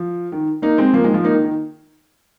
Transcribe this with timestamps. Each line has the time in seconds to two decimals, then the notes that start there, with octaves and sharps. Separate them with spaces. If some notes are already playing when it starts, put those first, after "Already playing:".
Already playing: F3
0.32 D#3
0.62 A#3 D#4
0.78 G#3 C4
0.93 F3 A#3
1.04 D#3 G#3
1.14 F3
1.24 A#3 D#4
1.34 D#3
1.44 D#3